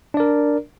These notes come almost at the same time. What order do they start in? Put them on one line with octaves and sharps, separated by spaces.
D4 D5 A#4